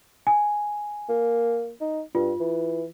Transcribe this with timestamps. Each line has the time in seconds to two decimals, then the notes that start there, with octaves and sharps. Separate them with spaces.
0.27 G#5
1.09 A#3
1.81 D#4
2.15 G2 F4
2.40 E3